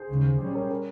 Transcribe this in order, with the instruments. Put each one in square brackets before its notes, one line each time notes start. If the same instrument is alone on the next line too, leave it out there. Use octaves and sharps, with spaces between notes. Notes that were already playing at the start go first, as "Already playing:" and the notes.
Already playing: [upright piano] G#4 C5
[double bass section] D#2 C#3 G#3
A#2 G3 C#4
[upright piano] A#4 C#5
A#4 C#5